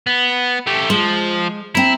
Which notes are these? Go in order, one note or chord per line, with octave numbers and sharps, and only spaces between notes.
B3
A3 G4
F3 G#3
C4 E4 A#5